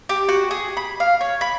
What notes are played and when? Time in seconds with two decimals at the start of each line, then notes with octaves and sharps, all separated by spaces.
0.09 G4
0.29 F#4
0.51 G#4
0.77 B5
1.00 F5
1.21 C#5
1.41 B5